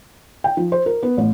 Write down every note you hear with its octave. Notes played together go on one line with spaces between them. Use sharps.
G5
F3
C5
A#4
B3
A1